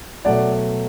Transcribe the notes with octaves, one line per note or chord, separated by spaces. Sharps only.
B2 F#3 A3 D5 F#5